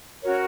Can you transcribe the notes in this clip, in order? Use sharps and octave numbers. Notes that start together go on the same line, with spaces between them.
C#4 F#4 A#4 C#5